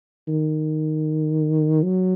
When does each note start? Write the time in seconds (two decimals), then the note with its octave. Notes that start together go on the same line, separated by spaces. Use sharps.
0.28 D#3
1.83 F#3